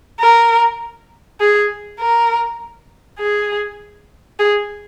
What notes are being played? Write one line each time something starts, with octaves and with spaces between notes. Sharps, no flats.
A#4
G#4
A#4
G#4
G#4